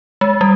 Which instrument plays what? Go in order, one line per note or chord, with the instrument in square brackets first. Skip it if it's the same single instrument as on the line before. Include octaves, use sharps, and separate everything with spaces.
[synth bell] G#3
G3